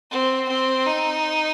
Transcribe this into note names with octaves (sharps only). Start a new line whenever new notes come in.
C4
C4
D#4